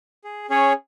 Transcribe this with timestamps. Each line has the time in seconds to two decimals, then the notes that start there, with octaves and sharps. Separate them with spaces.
0.24 G#4
0.50 C#4 G#4 C#5